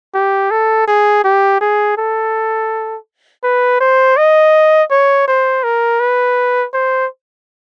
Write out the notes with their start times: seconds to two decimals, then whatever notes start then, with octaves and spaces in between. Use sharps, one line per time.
0.14 G4
0.51 A4
0.87 G#4
1.24 G4
1.61 G#4
1.98 A4
3.44 B4
3.80 C5
4.17 D#5
4.91 C#5
5.28 C5
5.64 A#4
6.00 B4
6.73 C5